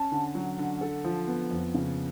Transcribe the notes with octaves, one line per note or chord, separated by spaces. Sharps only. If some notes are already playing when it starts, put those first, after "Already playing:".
Already playing: C#4 A5
D3
F#3
D3
A4
F3
B3
F2
C#3